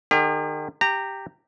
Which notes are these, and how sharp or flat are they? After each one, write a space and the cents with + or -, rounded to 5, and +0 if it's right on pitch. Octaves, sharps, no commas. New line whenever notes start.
D#3 -35 G4 +45
G4 +0 A#5 -20